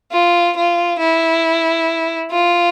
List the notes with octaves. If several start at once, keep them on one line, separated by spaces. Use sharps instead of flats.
F4
F4
E4
F4